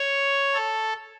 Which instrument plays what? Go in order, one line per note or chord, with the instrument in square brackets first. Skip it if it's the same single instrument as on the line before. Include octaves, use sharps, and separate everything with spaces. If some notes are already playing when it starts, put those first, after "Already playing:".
Already playing: [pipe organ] C#5
A4